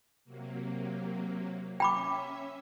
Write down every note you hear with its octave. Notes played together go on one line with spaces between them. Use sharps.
C3 F#3 A#3
C#4 E5 G5 B5 D6